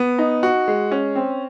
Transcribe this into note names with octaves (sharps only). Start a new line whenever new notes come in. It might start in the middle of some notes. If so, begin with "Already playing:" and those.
Already playing: B3
D#4
F#4
G#3
C#4
C4